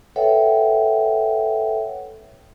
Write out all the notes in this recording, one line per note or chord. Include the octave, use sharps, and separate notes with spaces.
A4 B4 C#5 E5 F#5 G5